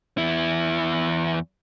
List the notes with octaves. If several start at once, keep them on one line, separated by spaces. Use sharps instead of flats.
E2 E4